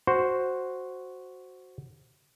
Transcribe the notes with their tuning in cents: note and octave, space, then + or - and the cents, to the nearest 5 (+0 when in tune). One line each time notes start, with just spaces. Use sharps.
F#4 +0 C5 +0